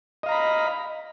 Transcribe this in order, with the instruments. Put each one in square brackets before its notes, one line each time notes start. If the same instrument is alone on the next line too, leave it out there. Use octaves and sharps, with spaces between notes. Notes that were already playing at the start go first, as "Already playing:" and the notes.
[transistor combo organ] D#5
F5
A#5
B5